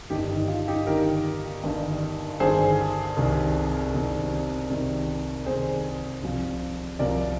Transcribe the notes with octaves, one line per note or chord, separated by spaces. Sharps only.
G1 G2 D#3 D#4 G4
D#4
F4
D#4 G4
G1 G2 D#3 G4 A#4
G1 G2 D#3
G1 G2 D#3 G#4 C5
C2 C3 D#3
C2 C3 D#3
C2 C3 D#3
C2 C3 D#3 G#4 C5
C2 C3 F3
C2 C3 F3 A#4 D5